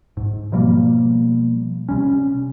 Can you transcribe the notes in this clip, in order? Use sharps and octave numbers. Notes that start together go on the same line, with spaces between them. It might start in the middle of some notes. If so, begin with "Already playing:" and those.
G#2
B2 F3 G3 A#3
C3 G3 C#4